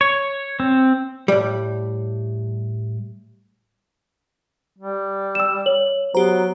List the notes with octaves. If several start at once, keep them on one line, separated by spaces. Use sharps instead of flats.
C#5
C4
A2 G3
G3
E6 E7
C#5 F#7
F#3 B3 G4 C5 A#5